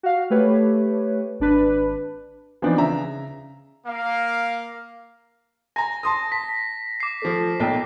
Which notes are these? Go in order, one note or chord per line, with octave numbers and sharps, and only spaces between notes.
F#4 F5
A3 G4 B4 C#5
G#1 D4 B4
E3 F3 B3 C4 D4 D#4
C#3 E5 A#5
A#3 F5
G#5 A#5 A#6
A5 C6 D#6
A5 B6
D6 C7
F3 A3
B1 A#2 G5